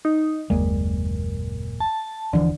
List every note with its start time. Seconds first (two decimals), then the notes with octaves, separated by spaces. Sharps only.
0.05 D#4
0.50 F#1 D#2 A#2 G#3
1.80 A5
2.33 D#1 D3 E3 F3